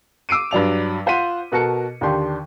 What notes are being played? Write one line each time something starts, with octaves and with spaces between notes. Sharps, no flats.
D6 E6 C7 D7 D#7
G2 F#3 D5 F7
F4 C5 F#5 B6 D#7
B2 F#4 A4 A#4 C#7
D#2 D3 D4 G4 C6